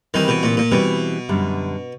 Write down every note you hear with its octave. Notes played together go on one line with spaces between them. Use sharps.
D#3 E3 G3 C4
B2
A#2
A#2
B2 E3 G3 C4
F#2 D3 G3